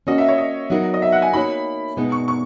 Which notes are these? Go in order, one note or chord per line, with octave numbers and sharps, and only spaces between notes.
A#3 C#4 F#4 D#5
E5
C#5
D#5
F#3 B3 D#4 F#4 A#4
D#5
E5
F#5
G#5
A#3 D#4 F#4 C#5 B5
B2 G#3 B3 D#4
C#6
C#6